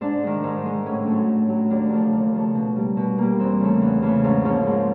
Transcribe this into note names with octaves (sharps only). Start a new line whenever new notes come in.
G#2 D4
D#3 G#3
G#2
D#3 G#3
A2 C#4
F#3 A3
A2
F#3 A3
D#2 D4
C#3 F3 A3
D#2
C#3 F3 A3
B2
G3 A#3
B2
G3 A#3
E2 C4
C#3 E3 A3
E2
C#3 E3 A3
G#2 C#4
F3 A#3 C#4
G#2